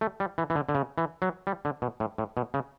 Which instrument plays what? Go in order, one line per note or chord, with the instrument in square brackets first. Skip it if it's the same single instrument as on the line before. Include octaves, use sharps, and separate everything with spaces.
[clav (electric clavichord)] A3
G3
E3
E3
D3
D3
C#3
E3
F#3
G3
D3
B2
A2
A2
B2
C#3